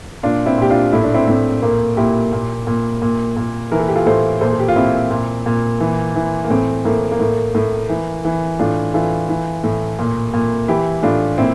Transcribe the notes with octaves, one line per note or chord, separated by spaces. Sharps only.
A#2 D4 F4
C4 E4
A#2 G4
D4 F4
A2 E4
D4
C4 E4
A2 C4
A#2 A#3
A#2 E4 G4
A#2
A#2
A#2
A#2
E3 A#4
A4
G4
F4 A4
A2 A4 C5
A#2 A4 C5
A4
G4
F4
A#2 C4 E4
A#2
A#2
E3
E3
A#3
A2 C4
A2 A#3
A#3
A2
A2
E3
E3
A2 D4 F4
E3 F4 A4
E3
A2
A#2
A#2
E3 E4 G4
A2 D4 F4
A#2 C4 E4